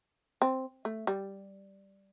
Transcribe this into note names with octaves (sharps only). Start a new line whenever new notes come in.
C4
A3
G3